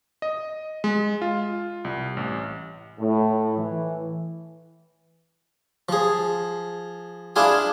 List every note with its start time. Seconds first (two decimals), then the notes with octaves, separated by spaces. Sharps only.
0.22 D#5
0.84 G#3
1.22 F4
1.85 C2
2.17 A1
2.99 A2
3.57 E3
5.89 F3 G#4
7.36 D4 E4 F4 G#4 G#5